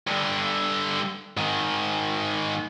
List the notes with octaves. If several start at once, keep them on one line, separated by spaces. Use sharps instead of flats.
G2 D3
G#2 D#3